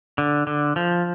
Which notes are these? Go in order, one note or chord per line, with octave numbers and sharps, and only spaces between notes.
D3
D3
F3